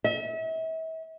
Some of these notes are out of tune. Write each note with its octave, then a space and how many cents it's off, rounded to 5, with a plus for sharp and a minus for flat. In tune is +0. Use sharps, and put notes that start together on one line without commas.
E5 -40